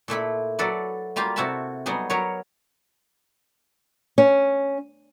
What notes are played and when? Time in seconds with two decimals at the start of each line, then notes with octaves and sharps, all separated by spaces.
0.08 A#2 A3 E4 B5
0.59 F#3 A4 B4 D5
1.16 G3 A#3 F4 G4
1.36 C3 E4 F#4 A4 A5 B5
1.86 F#3 G3 B3 D#4 G#4
2.10 F#3 A#4 B4 C#5
4.18 C#4